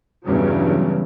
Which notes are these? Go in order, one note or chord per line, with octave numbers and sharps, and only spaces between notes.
E2 G2 C#3 F#3